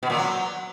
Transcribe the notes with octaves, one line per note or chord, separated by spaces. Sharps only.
B2
A#2
F#3